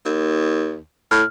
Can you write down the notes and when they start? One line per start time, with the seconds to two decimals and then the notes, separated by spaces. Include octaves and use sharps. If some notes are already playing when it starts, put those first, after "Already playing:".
0.06 D#2
1.11 A2 F6